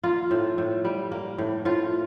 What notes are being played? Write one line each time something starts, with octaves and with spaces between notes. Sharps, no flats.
A#3 F4
A2
A2
G3
A#3
A2
A2 F4